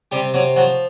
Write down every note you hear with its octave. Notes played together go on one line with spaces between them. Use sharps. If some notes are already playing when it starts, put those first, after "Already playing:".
C3 G3 G4
C3 F#3 F#4
F3 F#3 F#4